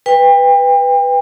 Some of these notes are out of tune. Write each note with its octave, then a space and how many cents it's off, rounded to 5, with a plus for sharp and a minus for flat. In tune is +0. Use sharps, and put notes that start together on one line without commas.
B4 +0 G5 +35